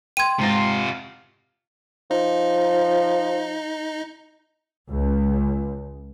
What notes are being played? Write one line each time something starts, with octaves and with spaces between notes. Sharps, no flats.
G5 C6 G#6 D#7
G#2 C3 F4 A#6
F3 D#4
C#2